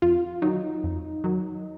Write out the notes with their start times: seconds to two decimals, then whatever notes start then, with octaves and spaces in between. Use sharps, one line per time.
0.02 F2 F4
0.42 D#3 F#3 D#4
0.84 F2
1.24 D#3 F#3